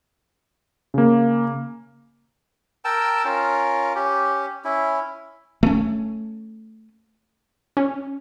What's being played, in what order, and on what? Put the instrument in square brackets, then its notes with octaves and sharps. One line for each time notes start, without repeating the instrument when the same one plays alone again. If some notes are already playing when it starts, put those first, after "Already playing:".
[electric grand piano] C#3 A#3
[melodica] A#4 G5 A5 E6
C#4 F4 A#4
C#4 G4
C#4 E4
[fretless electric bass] A3 C#4
[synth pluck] C#4